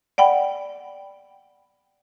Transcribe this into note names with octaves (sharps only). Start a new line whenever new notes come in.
D5 F#5 G5 B5